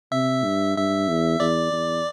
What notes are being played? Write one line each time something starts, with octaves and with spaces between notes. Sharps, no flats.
C3 E5
G2
G2 E5
E2
E2 D5
E2